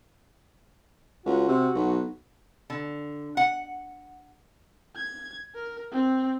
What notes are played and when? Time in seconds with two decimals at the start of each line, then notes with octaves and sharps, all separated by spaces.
1.26 C#2 F#4
1.48 C3
1.75 B1
2.70 D3
3.37 F#5
4.96 G#6
5.55 A#4
5.92 C4